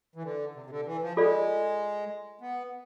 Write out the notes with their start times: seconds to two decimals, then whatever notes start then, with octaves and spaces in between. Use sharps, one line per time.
0.15 E3
0.23 D3
0.55 C3
0.66 C3
0.70 D3
0.86 E3
1.02 F3
1.17 G#3 F4 A4 D5
2.41 B3